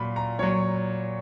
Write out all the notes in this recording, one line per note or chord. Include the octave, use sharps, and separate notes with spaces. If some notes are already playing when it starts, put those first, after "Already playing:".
Already playing: A#2 F#3 B5
A#5
A#2 F#3 C#5